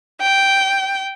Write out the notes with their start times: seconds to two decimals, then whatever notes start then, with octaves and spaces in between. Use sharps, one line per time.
0.21 G5